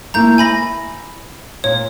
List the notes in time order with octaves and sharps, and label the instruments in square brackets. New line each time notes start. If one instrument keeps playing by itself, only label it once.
[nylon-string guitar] A3 A#3 E4 [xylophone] A#5 G6
[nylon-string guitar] E5 [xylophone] G#5 B5 A#6
[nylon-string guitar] A#2 [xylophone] C#5